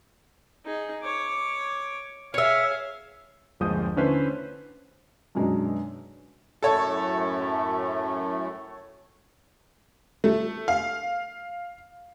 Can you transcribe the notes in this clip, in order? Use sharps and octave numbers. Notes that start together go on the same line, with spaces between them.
D#4 G#4
C#5 D6
G#4 C#5 E5 F5
G1 D#2 F3 G#3 D#6 G6
D3 A3 C#4 E4 B4 C5
F#2 B2 G#3 D4 D#4
F#2 A2 A3 A4 C#5
A3
F5